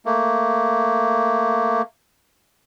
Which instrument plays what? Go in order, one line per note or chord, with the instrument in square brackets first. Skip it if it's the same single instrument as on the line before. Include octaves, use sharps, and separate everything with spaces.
[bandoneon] A3 A#3